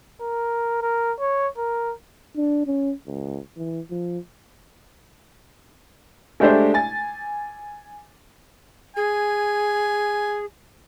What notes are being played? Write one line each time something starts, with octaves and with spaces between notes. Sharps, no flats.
A#4
A#4
C#5
A#4
D4
C#4
C#2
E3
F3
G#3 A3 D4 G4 C5 E5
G#5 A6
G#4 G#5